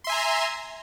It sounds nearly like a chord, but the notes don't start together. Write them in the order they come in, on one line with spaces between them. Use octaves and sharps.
C6 E5 G#5 A#5